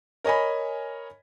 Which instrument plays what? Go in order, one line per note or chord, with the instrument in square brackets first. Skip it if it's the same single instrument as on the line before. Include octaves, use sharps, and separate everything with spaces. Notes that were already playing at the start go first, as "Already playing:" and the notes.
[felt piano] A#4 C#5 D#5 G#5 B5